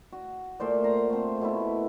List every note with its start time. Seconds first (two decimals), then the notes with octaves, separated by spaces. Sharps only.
0.13 F#4
0.60 A#2 A3 C5 D5
0.84 F4 A#5 C6
1.10 A3 C4
1.41 B2 A3 E4